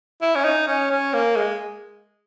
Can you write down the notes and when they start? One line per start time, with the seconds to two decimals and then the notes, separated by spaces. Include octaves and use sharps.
0.21 E4
0.35 C#4
0.44 D#4
0.67 C#4
0.91 C#4
1.13 A#3
1.36 G#3